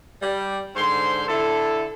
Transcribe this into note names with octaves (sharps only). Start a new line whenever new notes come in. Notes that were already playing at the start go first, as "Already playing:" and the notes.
G3
G#2 D3 C5 C6
D3 E4 A4